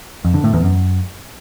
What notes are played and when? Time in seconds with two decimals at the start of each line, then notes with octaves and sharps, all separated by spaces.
0.25 F2
0.34 D3
0.44 A2
0.53 E2
0.63 F#2